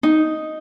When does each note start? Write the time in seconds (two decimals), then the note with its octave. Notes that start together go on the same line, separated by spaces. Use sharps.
0.03 D#4